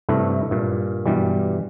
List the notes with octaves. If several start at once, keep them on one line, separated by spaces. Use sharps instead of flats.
G2 C3 A3 E4
G2 A#2
G2 B2 E3 G3